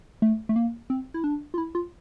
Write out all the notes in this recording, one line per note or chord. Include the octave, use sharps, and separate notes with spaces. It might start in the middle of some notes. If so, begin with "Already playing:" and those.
A3
A3
A#3
C4
E4
D4
F4
E4
F4